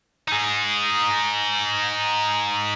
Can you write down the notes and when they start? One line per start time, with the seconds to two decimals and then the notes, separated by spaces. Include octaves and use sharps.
0.28 D#4 G#4